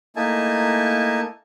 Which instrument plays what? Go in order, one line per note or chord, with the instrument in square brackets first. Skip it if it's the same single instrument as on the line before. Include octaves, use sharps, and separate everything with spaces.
[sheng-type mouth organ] A3 A#3 D#4 E4 G#5 A5